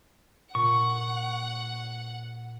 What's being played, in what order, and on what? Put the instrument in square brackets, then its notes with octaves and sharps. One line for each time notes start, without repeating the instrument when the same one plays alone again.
[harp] A#2 [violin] F#5 [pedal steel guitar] C#6